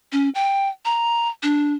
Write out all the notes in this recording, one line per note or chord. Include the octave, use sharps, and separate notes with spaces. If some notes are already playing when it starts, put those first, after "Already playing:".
C#4
G5
A#5
D4